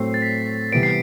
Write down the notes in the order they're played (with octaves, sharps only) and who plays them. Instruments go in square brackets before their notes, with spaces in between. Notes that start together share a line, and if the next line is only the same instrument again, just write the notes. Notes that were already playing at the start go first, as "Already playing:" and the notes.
Already playing: [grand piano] A2 F#3 A3 C4 [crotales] C7
[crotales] A6
B6
[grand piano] C3 E3 G3 B3 [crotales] D7
[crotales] C7